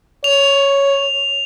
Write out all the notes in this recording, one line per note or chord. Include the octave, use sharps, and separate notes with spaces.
C#5 F7